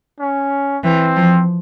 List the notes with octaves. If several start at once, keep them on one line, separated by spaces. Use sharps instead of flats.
C#4
E3 C4
F3